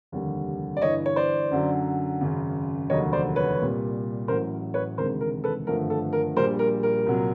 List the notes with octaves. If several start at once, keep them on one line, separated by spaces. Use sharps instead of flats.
F1 D#2 D3 G3
D5
G1 G2 E3 C#5 D#5
C#5
C5 D5
F#2 D3 F#3
G#1 F#2 C#3
F1 D#2 D3 F#3 C#5 D#5
C5 D5
B4 C#5
C2 A#2 G3
A1 A2 F#3 A#4 C5
B4 C#5
E1 D2 C3 D#3 G#3 A#4 C5
A#4
A4 B4
G#1 G2 D3 F3 A3 A#4
A4
A#4
A#1 A#2 G3 A#4 C5
A#4
A#4
C2 A#2 F#3